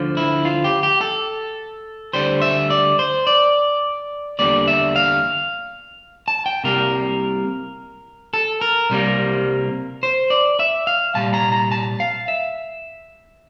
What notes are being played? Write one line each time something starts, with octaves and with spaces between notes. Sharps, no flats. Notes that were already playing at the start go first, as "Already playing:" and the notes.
Already playing: D2 D3 F3
E4
F4
G4
G4
A4
D2 D3 G3 C5
E5
D5
C5
D5
E2 D3 G3 A#3 D5
E5
F5
A5
G5
C2 C3 G3 A#3 A#4
A4
A#4
C2 C3 G3 A#3
C5
D5
E5
F5
C2 A#2 G3 A5
A#5
A#5
A5
F5
E5